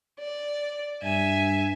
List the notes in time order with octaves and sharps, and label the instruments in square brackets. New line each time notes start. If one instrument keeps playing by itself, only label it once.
[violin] D5
[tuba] G2 [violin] E5 G#5